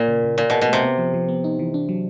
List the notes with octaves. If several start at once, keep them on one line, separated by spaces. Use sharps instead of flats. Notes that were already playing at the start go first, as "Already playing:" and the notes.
Already playing: A#2 A#3
C#3
C#3
A#2 F4
B2 G#4
B2
C3 A3
B3
F3
F3
B3
D#4
E3
D4
F#3